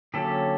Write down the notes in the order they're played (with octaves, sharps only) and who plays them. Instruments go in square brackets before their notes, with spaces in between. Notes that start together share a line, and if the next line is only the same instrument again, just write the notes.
[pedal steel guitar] D3 F#3 A#3 C#4 G4 A4